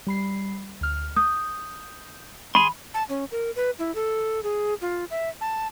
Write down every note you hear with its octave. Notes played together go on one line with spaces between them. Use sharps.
G3 B5 C7
D2 F6
D#6 G6
G#4 B5 C6
A5
C#4
A#4
B4
E4
A4
G#4
F4
E5
A5